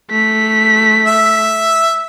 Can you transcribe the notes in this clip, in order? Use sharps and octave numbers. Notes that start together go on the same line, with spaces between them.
A3 B6
E5